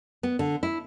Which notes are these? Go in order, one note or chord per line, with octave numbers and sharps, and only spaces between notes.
B3
D3
E4